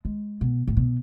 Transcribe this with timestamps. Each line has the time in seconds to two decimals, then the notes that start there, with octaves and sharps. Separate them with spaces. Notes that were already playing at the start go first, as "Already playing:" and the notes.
0.05 G#3
0.41 B2
0.67 A2
0.77 B2